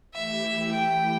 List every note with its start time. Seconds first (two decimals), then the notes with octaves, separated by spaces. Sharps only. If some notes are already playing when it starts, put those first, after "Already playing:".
0.14 E3 A3 E4 G4 E5
0.72 G5